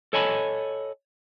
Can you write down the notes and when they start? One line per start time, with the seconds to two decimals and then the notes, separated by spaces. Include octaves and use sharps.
0.13 A4 C#5 D#5 G#5 A5 B5